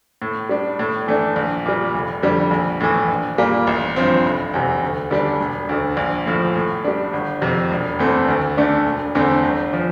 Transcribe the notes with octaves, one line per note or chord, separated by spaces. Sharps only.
A2
G3 D4
A2
E3 A3 D4
A#1
A#2 G3
F1
F2 D3 G3
A#1
A2 E3
A#1
A#2 G3 A#3
A1
G2 F3 C4
F1
E2 C3
D2
D3 G3 D4
E1
D2 D3
A#1
A2 F3
A2
G3 D4
G1
F2 C3
E1
E2 E3 A3 C4
D2
D3 A3 D4
E1
E2 D3 A3 C4
G1
F3